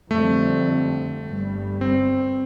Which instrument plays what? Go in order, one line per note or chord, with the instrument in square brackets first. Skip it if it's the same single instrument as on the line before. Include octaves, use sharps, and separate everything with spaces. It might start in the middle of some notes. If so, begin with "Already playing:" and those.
[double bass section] F2 D3 G3 C4 [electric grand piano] A3
[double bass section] G1 G2 G3
[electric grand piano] C4